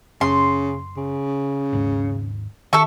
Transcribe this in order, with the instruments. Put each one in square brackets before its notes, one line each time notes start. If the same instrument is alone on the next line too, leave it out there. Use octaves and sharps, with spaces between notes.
[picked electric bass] F#1 [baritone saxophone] C#3 [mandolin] C6
[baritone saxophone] C#3
[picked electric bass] G#1 D#2 G#2
[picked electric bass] D#3 [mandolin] A4 E5 C#6